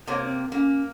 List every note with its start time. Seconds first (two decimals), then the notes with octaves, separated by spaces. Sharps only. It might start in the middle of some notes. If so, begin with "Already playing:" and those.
0.07 C3 A#3 C#5
0.25 C4
0.52 A#3 C#4